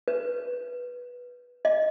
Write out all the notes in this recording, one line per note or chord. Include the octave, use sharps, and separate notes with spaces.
B4
D#5